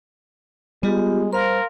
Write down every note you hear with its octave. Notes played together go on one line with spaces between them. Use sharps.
G3 G#3 B3 F4 G4
A#4 C5 F5 C6